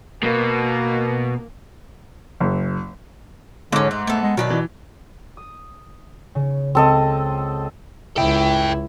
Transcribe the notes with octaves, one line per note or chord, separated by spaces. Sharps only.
B2 A#3
F#1
G#2 D3 F#3 C#4 D6
G#3 A3
A3 B3 A4
G#3
B2 D#3 F#3 B4 D5
E3
D#6
C#3
C#2 C4 A4 D#5
C#2 E4 A4 G5